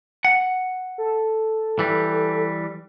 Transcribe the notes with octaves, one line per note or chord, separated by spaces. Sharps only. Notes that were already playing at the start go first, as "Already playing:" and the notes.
F#5
A4
E3 G3